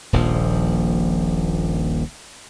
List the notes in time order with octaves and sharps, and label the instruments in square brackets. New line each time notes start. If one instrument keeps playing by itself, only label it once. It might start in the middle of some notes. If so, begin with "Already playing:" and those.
[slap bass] D#1 A#1 F3